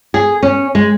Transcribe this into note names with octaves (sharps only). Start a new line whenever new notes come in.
G#4
C#4
G#3